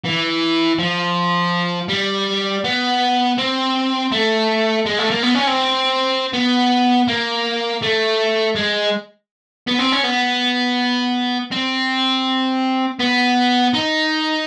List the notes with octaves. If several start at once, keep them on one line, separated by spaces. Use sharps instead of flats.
E3
F3
G3
B3
C4
A3
G#3
A3
A#3
B3
C#4
C4
B3
A#3
A3
G#3
B3
C4
C#4
B3
C4
B3
D#4